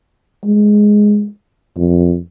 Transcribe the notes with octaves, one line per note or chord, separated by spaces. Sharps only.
G#3
F2